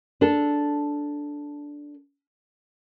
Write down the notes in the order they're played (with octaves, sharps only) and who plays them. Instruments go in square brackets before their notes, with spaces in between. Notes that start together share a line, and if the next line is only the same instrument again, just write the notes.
[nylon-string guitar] D4 A4